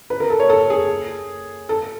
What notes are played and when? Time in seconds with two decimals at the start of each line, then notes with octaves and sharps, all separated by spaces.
0.10 B4
0.20 A#4
0.30 A4
0.40 C#5
0.50 A4
0.70 G#4
1.69 A4